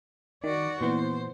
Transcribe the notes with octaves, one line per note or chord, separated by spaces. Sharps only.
D#3 F#4 D5
A#2 E3 B3 C5